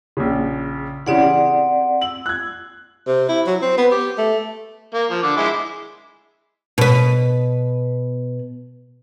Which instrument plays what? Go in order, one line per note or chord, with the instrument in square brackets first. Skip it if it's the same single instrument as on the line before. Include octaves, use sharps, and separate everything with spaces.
[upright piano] A#1 C#3
[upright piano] C#3 E3 [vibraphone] C4 D5 F#5
[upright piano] G4 G#4
[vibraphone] E6 [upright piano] F#7
[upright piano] F#6 G#6
[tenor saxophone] C3
E4
F#3
C4
B3
G4
A3
[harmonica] A#3
F3
D3 D6
G#3 E4 D6
[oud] B2 B4